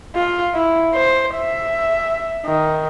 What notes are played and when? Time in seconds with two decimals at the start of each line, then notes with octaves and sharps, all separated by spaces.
0.16 F4
0.54 E4
0.94 C5
1.36 E5
2.46 D#3